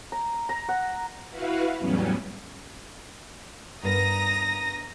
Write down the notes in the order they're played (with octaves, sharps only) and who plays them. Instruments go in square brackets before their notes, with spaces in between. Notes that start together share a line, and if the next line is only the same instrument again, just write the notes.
[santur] A#5
A#5
F#5
[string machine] E4 F#4 B4 F5
E2 A2 F#3 G3 B3 C#4
[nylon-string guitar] G2 B3 A#4 [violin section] A#5 D#6 A#6